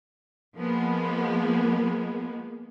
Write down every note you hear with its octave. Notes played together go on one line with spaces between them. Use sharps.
F3 G#3 A#3 B3